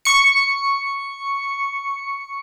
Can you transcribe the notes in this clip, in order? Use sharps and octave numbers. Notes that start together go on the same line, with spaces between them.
C#6 C#7